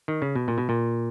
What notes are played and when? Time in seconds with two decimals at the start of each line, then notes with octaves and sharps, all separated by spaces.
0.08 D#3
0.22 C#3
0.35 B2
0.48 A#2
0.58 B2
0.69 A#2